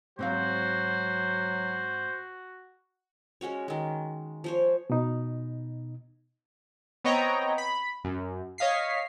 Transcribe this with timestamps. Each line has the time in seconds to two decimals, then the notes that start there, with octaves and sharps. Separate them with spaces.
0.19 G#2 F#3 C4 F#4 C5 F5
3.41 G#3 C#4 F#4 C#5
3.68 D#3 G#3
4.44 F3 C5 C#5
4.90 B2 D#4
7.04 B3 C4 C#5 D#5 G5 A#5
7.58 B5
8.04 F#2
8.58 C#5 D#5 F5 B6 C7